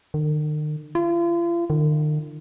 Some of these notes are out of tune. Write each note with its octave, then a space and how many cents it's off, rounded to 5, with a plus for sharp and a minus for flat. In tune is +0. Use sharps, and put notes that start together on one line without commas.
D#3 -45
F4 -40
D#3 -45